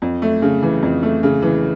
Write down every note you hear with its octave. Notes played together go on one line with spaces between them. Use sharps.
F2
A3
C#3
E3
F2
A3
C#3
E3